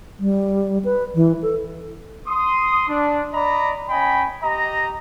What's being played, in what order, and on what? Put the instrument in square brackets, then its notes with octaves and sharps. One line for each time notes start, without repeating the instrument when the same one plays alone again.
[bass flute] G3
B4
E3
A4
[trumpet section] C6 D#6
D4
D5 D#5 A#5 B5
C#4 D#5 G5 G#5 B5
G4 D#5 A#5